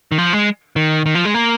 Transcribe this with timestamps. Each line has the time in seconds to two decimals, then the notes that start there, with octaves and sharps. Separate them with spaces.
0.12 D#3
0.18 F3
0.33 G#3
0.76 D#3
1.06 D#3
1.15 F3
1.25 G#3
1.34 A#3